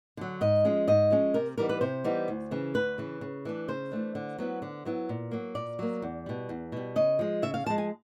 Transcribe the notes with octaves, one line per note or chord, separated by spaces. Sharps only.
D3 F#3
G#2 D#5
F3 G#3 C#4
G#2 D#5
F3 G#3 C#4
C3 A#4
E3 G3 B3 D#4 A#4
B4
C3 C5
E3 G3 B3 D#4
D2
C#3 E3
D2 B4
C#3 E3
C#3
E3 A3 D4
C#3 C5
E3 A3 D4
D3
F#3 B3 E4
D3
F#3 B3 E4
A#2
F#3 A#3
A#2 D5
F#3 A#3
E2
B2 G3
E2
B2 G3
C#3 D#5
F3 G#3
C#3 E5
F5
F3 G#3 A5
G#5